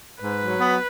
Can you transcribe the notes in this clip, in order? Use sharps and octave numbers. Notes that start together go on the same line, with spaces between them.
G#2 B4
F#3
B3